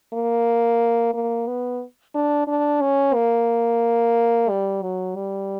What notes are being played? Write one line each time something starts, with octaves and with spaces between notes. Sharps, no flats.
A#3
A#3
B3
D4
D4
C#4
A#3
G3
F#3
G3